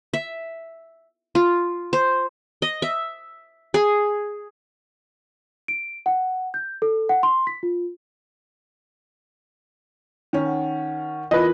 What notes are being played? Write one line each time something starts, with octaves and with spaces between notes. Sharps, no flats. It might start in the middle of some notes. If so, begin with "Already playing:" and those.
E5
F4
C5
D#5
E5
G#4
D7
F#5
G6
A4
F#5
C6
B6
F4
D#3 C#4
F#5
E2 F4 A#4 B4 D#5